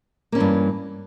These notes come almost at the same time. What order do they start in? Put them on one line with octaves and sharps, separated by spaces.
A#3 C#4 E3 G2